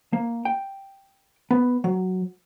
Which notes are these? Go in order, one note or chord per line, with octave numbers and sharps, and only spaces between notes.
A#3
G5
B3
F#3